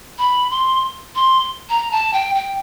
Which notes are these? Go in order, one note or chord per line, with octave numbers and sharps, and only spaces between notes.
B5
C6
C6
A#5
A5
G5
G5